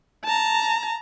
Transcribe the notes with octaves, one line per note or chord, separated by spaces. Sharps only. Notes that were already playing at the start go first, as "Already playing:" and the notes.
A5 A#5